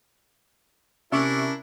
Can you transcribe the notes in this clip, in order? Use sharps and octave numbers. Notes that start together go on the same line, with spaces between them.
C3 C#4 D4 E4 A#4 E5 C#6 D6